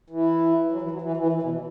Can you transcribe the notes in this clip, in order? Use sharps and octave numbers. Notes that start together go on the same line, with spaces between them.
E3
F#3
E3
F#3
E3
E3
E3
B2